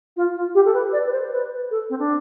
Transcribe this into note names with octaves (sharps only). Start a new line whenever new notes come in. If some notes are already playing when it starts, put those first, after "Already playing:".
F4
F4
G4
A4
B4
D5
B4
C5
B4
A4
C4
D4